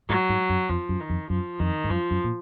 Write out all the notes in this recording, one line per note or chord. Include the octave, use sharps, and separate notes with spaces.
G#2 F#3
G#2
F#2
F2 F3
F#2
D#3
F2
F#2 F3
F2 D#3
G#2
F#2 F3
F#2
A#2